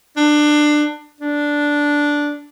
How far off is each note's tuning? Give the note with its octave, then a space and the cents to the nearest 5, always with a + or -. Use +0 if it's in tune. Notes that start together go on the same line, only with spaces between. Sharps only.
D4 +20
D4 -5